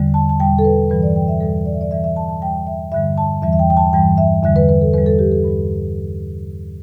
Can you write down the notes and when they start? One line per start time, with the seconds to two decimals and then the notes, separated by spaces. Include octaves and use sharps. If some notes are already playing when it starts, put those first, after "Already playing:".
Already playing: E2 D3 G3
0.14 A5
0.29 A5
0.39 E2 B2 G3 G5
0.59 A4
0.65 B4
0.90 G2 E3 G3 B4
1.03 D5
1.16 G5
1.28 E5
1.40 E2 B2 G3 A4
1.66 D5
1.73 E5
1.81 D5
1.91 E2 E3 G3 E5
2.04 E5
2.16 A5
2.29 A5
2.42 E2 E3 G3 G5
2.67 E5
2.92 G2 D3 G3 E5
3.18 A5
3.42 E2 E3 G3 E5
3.53 E5
3.59 G5
3.70 G5
3.77 A5
3.93 G2 E3 G3 G5
4.18 E5
4.43 E2 D3 G3 E5
4.56 B4
4.69 B4
4.81 A4
4.93 E2 D3 G3 B4
5.06 A4
5.19 G4
5.32 A4
5.44 G2 G3